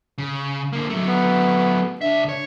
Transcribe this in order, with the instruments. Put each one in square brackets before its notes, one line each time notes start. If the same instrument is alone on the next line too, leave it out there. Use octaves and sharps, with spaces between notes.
[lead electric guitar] C#3
D3 A#3
F#3 A3
[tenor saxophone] B3
[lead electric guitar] C#2 E5 [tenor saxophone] D4
[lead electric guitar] C#5